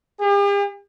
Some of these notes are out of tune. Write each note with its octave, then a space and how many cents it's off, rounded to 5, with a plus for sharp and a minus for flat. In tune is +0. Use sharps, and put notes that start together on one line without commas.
G4 +45